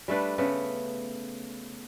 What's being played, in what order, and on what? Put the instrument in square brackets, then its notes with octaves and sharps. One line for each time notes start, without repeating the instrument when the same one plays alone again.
[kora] G3 A3 D4 B4
C#3 A3 B3